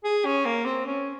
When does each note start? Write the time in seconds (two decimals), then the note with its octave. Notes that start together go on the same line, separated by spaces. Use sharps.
0.04 G#4
0.25 C#4
0.46 A#3
0.65 C4
0.86 C#4